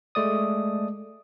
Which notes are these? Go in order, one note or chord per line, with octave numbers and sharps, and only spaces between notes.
G#3 A3 D5 D#6